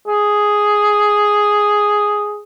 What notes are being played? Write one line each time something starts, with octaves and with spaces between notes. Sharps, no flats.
G#4